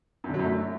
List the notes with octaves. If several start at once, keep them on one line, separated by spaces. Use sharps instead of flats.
F#2
D3
F#3
F#2
A3